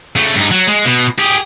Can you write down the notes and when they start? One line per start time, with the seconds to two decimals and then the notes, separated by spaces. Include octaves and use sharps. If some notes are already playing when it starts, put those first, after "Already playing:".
0.16 C#3 A3
0.35 G2 D#4
0.51 F#3
0.67 G#3
0.85 B2
1.19 G4 G#4